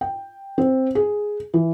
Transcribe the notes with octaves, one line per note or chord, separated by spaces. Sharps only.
G5
C4
G#4
E3